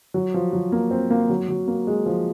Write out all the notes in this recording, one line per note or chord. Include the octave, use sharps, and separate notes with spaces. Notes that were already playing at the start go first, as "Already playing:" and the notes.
F#3
F3
F#3
A#3
C4
A#3
F#3
F#3
A#3
G#3
F3